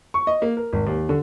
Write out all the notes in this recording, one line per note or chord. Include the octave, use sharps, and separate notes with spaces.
C#6
D#5
A#3
A#4
G#1
D#2
D3